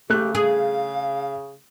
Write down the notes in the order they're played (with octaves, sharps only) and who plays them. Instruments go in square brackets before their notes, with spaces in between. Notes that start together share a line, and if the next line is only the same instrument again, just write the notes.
[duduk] C#3 [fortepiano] A3 F#6 [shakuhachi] G4
[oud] G#4 [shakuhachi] F5